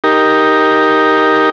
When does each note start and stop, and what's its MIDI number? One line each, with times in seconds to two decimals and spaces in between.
0.04 1.50 63
0.04 1.50 67
0.04 1.50 70